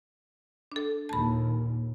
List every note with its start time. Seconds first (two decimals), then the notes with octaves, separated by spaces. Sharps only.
0.72 D4 A4
1.09 D#2 A#2 A5 B5